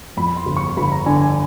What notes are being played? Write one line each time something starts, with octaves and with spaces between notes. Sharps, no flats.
F2 B5
C6
G1
C#6
G1 B5
A#5
D3 G#5
G#5